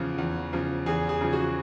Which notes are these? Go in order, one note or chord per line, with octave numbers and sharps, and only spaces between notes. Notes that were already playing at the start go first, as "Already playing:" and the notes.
Already playing: E2 C#3 F3
E2
C#3 F3
E2 G#4
G#4
C#3 F3
F#4